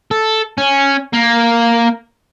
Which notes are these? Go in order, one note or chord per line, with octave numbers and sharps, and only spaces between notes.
A4
C#4
A#3